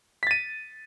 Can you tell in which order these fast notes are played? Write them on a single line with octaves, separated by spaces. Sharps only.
B6 A6 D#7